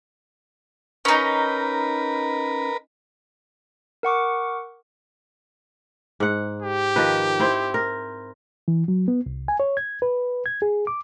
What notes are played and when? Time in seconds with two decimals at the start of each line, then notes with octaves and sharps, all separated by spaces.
1.05 C#4 D#4 A#4 B4
4.03 A#4 F#5 C#6 D6
6.20 G#2 F#5
6.62 G4
6.96 D#3 F3 B4
7.39 C4 E4 C5
7.74 A#4
8.68 E3
8.88 F#3
9.08 B3
9.26 C2
9.48 G#5
9.60 C#5
9.77 G#6
10.02 B4
10.46 G#6
10.62 G#4
10.87 D6